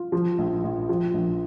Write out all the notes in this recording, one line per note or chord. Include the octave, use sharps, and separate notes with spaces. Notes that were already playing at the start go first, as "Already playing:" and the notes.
Already playing: F4
F3
A#1
A#1
F3
A#1